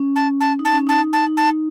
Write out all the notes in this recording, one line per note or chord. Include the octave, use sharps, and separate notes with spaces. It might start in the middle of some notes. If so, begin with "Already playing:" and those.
Already playing: C#4
A5
A5
D#4
A5
C#4
D#4 A5
A5
D#4
A5